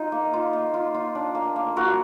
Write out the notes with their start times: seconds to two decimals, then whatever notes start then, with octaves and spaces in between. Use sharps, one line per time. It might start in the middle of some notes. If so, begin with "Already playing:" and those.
Already playing: D#4 F4
0.12 A#3
0.33 F4
0.53 A#3
0.74 F4
0.94 F4
1.15 D4
1.35 A#3
1.56 A#3
1.76 F4 F#4 A#4